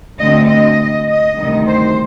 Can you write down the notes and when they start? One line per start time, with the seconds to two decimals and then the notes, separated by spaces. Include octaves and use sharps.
0.20 D2 D3 A3 C4 D#5
0.49 D#5
1.08 D#5
1.37 D2 C3 D#3 G3
1.66 C5